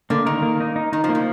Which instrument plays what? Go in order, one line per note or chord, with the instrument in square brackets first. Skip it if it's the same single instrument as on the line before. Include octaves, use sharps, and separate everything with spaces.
[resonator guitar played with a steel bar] D3 [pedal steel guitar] A#3
[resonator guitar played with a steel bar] D#3 [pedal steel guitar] A#4
[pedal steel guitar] A#3
D#4
D#4
[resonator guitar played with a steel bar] D#3 [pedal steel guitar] D#4
[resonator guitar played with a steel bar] F3
[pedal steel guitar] A#3
[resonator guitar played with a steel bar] F3